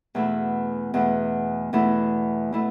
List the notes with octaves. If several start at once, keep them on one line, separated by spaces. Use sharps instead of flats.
E2 B2 A3 E4
E2 B2 A3 E4
E2 B2 A3 E4
B2 A3 E4